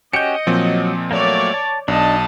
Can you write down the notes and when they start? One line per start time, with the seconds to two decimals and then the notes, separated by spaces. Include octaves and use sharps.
0.13 C#4 F#4 G4 D#5 G6 C#7
0.47 A#2 F3 F#3 C4
1.11 F#3 A3 A#3 C#5 D5
1.54 A5
1.88 B1 D4 D#5 A5